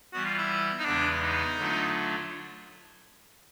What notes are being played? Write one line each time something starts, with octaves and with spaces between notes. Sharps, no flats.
E3 G3 B3 F#4
F4
E4
D#4
E2 C#3 E3 G#3 B3 D4
D#4
D3 F#3 A3 D4 F4